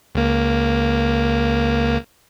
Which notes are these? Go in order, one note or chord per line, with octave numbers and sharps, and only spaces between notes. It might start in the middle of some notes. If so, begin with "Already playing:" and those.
C#2 A#3